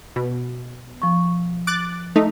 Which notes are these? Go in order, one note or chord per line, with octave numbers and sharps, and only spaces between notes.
B2
F3 C#6
D6 F#6 A6
A3 D#4